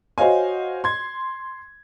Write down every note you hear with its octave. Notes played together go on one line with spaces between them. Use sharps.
F#4 C5 C#5 D#5 F5 G#5
C6 G#6